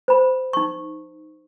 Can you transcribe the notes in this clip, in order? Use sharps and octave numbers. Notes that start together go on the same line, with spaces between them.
C5 B5
D#4 C#6